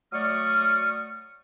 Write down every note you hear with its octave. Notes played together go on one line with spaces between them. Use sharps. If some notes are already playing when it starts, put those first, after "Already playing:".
F#3 A3 D5 C#6 D#6 F6